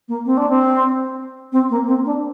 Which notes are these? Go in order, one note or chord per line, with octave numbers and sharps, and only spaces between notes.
A#3
C4
D4
C4
C4
A#3
C4
D4